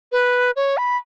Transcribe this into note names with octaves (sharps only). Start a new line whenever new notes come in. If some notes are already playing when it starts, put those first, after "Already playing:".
B4
C#5
B5